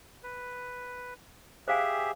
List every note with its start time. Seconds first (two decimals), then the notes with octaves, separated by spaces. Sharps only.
0.24 B4
1.68 G4 G#4 C5 E5 F5 G#5